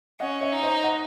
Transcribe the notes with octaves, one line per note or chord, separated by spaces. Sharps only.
C#4 D#5 F#5
C#5 E5
D#4
C5 D#5
D#5 F#5